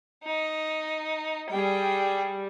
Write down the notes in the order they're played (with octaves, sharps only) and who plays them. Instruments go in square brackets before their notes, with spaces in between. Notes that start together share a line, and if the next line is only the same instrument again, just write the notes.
[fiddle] D#4
[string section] G3 [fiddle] G#4 G5